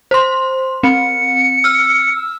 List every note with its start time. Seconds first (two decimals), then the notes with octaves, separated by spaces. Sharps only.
0.11 C5 C6
0.83 C4 C#7
1.64 E6 F6
2.16 E6